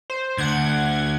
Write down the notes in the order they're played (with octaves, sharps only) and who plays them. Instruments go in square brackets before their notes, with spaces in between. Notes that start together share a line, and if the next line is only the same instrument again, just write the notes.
[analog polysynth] C5
[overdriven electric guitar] D2 [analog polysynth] F#5 G#6